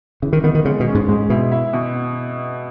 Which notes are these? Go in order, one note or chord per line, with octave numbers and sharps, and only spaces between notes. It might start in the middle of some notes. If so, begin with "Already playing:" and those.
C#3 E3
D#3
D#3 B3
D#3
C#3 G#3
B2
C#4
G#2
G#2 G#3
B2 E4
E4
B2